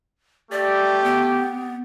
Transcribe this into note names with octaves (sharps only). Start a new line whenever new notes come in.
A3 G4 D5
B3